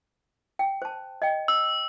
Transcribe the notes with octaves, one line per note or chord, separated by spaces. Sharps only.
G5
C5 A5
D#5 G5
E6